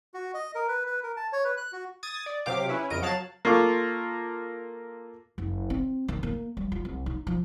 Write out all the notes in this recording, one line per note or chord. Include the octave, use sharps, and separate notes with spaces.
F#4
D#5
A#4
B4
B4
A#4
A5
C#5
B4
F#6
F#4
D#6 G#6 A6
D5
C3 F#3 G4 F5 D6
C#4 E4 B4 C#5
F2 C#3 A#4 D#5 D7
F#3 C#5 F5 A5 F#6 A6
A#3 F4 A4 C#6 D6
F#1
C4
D#3
A#3
G3
F4
C2
D#4
F3